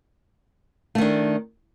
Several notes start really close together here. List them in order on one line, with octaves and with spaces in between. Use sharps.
A3 D#3 D4